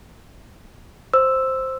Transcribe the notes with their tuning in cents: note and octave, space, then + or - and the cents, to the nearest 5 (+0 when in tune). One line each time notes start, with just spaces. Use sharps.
C5 +5 E6 +0